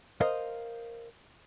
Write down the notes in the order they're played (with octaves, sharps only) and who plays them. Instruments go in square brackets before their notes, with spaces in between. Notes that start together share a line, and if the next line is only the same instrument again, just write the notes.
[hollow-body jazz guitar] A#4 C5 D#5 F5